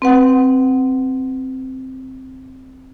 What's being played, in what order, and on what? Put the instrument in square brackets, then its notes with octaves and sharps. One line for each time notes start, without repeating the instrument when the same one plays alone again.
[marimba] C4 B4 F#5